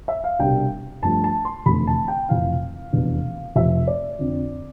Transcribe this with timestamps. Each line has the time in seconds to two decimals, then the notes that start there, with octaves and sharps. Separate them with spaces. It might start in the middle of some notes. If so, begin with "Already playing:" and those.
0.08 E5
0.24 F5
0.39 C2 B2 G3 D4 G5
1.03 G2 F3 A3 A5
1.24 A5
1.45 C6
1.66 F1 E2 D3 A3 B5
1.87 A5
2.08 G5
2.29 F1 F2 E3 F5
2.92 F1 E2 B2 B3 D4
3.55 F1 F2 C3 F3 E5
3.87 D5
4.19 F2 D3 F3 C4